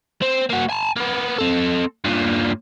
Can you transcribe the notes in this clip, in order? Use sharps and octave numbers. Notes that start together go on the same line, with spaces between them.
C4
A#3 F#4
G#5 A5
A#3 B3
C4 A4
G2 A#2